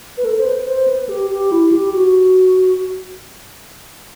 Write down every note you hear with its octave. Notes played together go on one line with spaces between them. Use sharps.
B4
A4
C5
B4
C5
B4
G4
G4
E4
G4
F#4